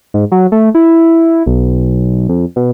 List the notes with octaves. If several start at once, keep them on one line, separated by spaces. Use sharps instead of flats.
G#2
F#3
A3
E4
B1
F2
B2